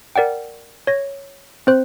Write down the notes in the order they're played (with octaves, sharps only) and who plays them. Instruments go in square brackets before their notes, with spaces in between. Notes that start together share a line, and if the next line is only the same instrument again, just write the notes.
[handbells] A#4 D5 F#5 G5
C#5 A#6
C4 C5 F#6